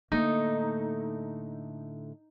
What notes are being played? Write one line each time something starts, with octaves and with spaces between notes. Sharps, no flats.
A2 D3 A3 A#3 D#4